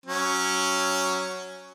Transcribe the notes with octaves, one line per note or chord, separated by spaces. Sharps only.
F#3 C#4